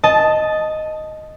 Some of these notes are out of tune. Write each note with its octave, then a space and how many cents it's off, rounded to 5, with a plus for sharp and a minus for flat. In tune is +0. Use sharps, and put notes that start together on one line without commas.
D#5 +0 A5 +0